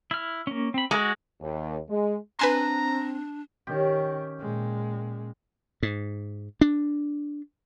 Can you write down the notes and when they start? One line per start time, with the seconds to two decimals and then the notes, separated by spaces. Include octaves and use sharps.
0.11 E4 F6
0.47 A#3 C#4
0.74 C4 B5
0.91 G#3 F#4
1.41 D#2
1.89 G#3
2.39 C4 D4 B4 G#5 A#5 C6
3.67 D#3 C#4 G4
4.39 A#2 G#3
5.83 G#2
6.61 D4